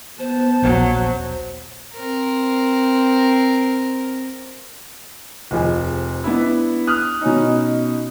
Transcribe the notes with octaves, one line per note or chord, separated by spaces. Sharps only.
B3 C5 A5
D#1 A#1 F#3 C5
C4 A#4
F1 F3 G#4
B3 D4 E4
D#6 F6 F#6
B2 C#4 D#4